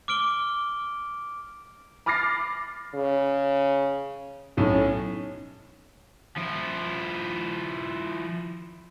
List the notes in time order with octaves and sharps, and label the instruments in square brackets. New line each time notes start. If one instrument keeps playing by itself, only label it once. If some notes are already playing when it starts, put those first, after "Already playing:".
[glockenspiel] D6 F6 D7 G7
[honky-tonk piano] B5 D6 F6 A6 A#6 C7
[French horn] C#3
[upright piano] B1 A2 [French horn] C#4
[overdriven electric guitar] F3 E4